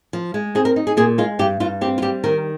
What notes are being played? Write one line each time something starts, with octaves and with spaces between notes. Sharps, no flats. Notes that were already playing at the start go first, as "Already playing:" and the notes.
F3
G#3
C4 G#4
A#4
D#4
G#4
A#2 G#4
G#3 F4
G2 G4
G2 F4
C4 G4
F4
G3 G4
D#3 A#4